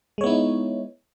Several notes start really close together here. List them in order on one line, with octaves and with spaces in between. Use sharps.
G#3 C#5 B3 E4 D#4